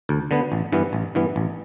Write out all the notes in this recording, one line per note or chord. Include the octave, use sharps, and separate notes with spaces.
D2
D3 B3
A1
G2 E3 B3
A1
G2 E3 B3
A1